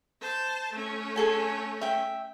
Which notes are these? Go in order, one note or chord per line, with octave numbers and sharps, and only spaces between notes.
C5 A5
A3 C#4
G#4 A4 G#5
E5 G5